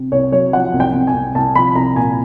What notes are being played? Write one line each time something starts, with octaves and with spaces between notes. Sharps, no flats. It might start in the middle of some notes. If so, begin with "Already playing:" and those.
Already playing: C3
C2 C#5
F#3 C#5
F3 F#5
C2
G5
C2
G#5
C2
C2 A5
F3 B5
C2 A#5
A#2 G#5